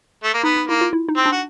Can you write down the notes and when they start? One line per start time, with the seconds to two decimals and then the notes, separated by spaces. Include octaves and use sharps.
0.24 A3
0.34 A#3
0.43 B3 D#4
0.56 D#4
0.68 A#3 E4
0.81 F4
0.93 E4
1.09 D#4
1.17 C4
1.26 D4
1.32 F#4